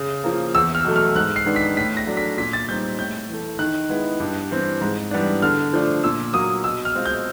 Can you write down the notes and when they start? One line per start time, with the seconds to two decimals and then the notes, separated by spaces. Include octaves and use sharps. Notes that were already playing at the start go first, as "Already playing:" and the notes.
Already playing: C#3
0.24 F3 A#3
0.55 E2 E6
0.75 F6
0.85 B2 F#3 A3
0.96 F6
1.15 G#2 F#6
1.36 C7
1.46 D#3 G#3 B3 D4
1.56 B6
1.76 A2 B6
1.97 A#6
2.07 F#3 A3 D4
2.17 B6
2.38 A#2 B6
2.53 A6
2.69 G3 C4 D#4 G6
2.98 A2 G6
3.29 E3 A3
3.59 D#3 F#6
3.89 G#3 B3 E4
4.20 G2
4.51 E3 G3 C4
4.81 G#2
5.11 E3 G3 B3 D4
5.42 D3 F6
5.73 F3 A3 D4
6.03 A#2 E6
6.33 F#3 A#3 D#6
6.64 B2 E6
6.85 F6
6.95 G#3 C4 F4
7.06 G6